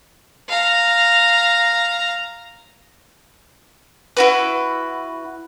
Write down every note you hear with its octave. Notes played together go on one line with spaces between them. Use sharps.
F5 A#5
E4 F#4 B4